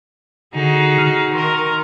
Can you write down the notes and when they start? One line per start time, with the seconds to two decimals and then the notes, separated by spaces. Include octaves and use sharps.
0.55 D3 D#4 F#4 G#4
0.98 F6
1.34 D#3 A#4 C6